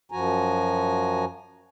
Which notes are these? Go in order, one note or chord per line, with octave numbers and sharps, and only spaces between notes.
F#2 F3 F#4 G#5 A#5